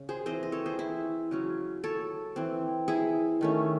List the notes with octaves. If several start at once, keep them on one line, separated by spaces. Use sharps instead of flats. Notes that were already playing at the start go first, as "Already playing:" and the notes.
Already playing: C#3
G#4 C5
E3 C4 C5 D#5
D#5
A4 C#5
G#4 C5
E4
C#3 F#3 C#4
A4 C#5
E3 C4
E4 G#4
D#3 A3 C#4